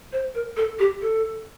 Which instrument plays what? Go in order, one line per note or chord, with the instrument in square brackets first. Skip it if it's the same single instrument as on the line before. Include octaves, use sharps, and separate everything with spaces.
[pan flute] C5
A#4
A4
G4
A4